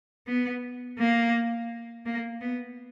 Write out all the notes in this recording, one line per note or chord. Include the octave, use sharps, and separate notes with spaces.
B3
A#3
A#3
B3